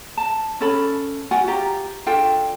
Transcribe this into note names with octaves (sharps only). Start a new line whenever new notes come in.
A5
C#4 A4 B5
F4 F#4 F#5 G#5
F4 G4 A#5
D4 F4 A4 G5